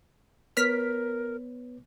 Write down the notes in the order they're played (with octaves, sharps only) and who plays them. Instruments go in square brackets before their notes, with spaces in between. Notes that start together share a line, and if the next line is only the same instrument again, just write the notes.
[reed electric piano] B3 B4 C#5 [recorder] A#4 [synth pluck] F6 B6